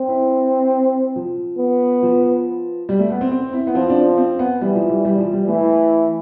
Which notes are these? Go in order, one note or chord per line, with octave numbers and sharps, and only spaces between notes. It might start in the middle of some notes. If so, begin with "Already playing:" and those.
Already playing: C4
E4
F3
B3
F3
G3
A3
B3
C4
C4
E4
B3
F3 C4
D4
C4
C4
B3
E3 G3
F3
G3
G3
F3
G3
E3 A3